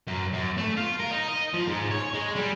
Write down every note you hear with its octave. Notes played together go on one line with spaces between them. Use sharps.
F#2
F#2
A3
F4
A#4
D#4
D#5
F3
G#2
C#5
G#3
G3